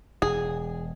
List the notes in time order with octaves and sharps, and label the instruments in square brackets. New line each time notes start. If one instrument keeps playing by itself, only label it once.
[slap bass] E1 [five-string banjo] G#4